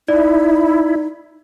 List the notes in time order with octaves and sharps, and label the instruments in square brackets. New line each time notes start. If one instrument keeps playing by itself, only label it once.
[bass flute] D#4 [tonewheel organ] E4 [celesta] D5